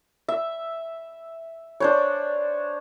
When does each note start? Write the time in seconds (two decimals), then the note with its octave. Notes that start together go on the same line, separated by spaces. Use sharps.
0.28 E5
1.80 D4 C5 C#5